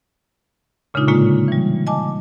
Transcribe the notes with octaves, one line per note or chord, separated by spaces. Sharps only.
A#2 C#3 G#3 D4 D#4 F4
A2 D3 G#3 A#3 F4
E3 G3
D#5 G#5 A5 D6